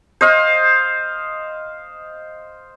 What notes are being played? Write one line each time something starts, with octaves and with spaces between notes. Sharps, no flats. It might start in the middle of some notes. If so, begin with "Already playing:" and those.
C5 D#5 F5